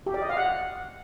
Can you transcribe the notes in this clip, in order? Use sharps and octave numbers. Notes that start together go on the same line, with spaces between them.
G4
D5
D#5
F5
F#5